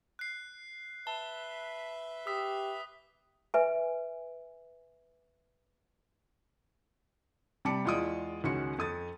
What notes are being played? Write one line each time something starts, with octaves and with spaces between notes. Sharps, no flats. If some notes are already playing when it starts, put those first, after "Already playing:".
F#6 C7
B4 E5 A5 G7
G4 D#6 E6 B6
B4 E5 G#5
C3 G3 D5 A5 D6 C#7
E2 G#3 F4 D5 D#6 D7
C#2 D#3 C#4 F#4 C6 C#7
F2 D#6 A6